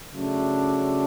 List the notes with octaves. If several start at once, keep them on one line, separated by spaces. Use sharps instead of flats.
C#3 F#3 A3 D4